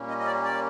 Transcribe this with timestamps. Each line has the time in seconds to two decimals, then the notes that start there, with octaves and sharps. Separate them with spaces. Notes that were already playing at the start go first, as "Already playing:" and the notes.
Already playing: A#2 G3 A#3 C#4
0.09 D#5
0.19 D#5
0.26 D5
0.44 D5